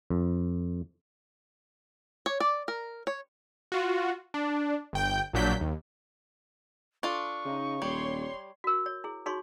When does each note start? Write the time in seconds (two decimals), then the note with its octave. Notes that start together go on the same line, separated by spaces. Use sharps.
0.10 F2
2.26 C#5
2.40 D5
2.68 A#4
3.07 C#5
3.72 F4 F#4
4.34 D4
4.93 G1 G5 G6
5.33 A#1 A#2 F#3 D4 G6 B6
5.61 D#2
7.03 D4 F4 A4 C#6
7.45 C#3 D#4
7.82 D#1 G3 C#5 C6
8.64 F#4 A#4
8.86 C#5
9.04 E4 G#4
9.26 D#4 F#4 G#4 C#5 C6 C#6